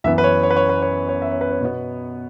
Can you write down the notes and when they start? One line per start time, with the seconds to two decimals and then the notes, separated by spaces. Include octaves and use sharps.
0.04 F#2 E3 B3 E5
0.18 B4
0.24 C#5
0.43 C#5
0.51 B4
0.56 C#5
0.69 B4
0.82 C#5
1.09 C#5
1.22 E5
1.31 C#5
1.41 B4
1.51 C#5
1.61 B2 B3